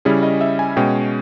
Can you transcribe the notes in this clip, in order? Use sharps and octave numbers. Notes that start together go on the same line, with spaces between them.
C#3 G3 C#4 E4 G#4
D#5
E5
G#5
B2 G#3 C#4 G5